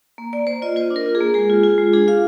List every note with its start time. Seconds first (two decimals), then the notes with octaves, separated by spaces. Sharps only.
0.18 A#3
0.33 A#3 D5
0.47 A#3 C5
0.62 F4 D#5
0.76 F4 C5
0.90 D4
0.96 A#4
1.06 F4
1.15 G#4
1.21 A#3
1.34 G#3 G#4
1.50 F4
1.64 F4
1.78 G#3
1.93 D4 G#4
2.08 F4 F5